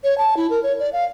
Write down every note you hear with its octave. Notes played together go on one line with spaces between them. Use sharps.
C#5
A5
E4
A#4
C#5
D5
F5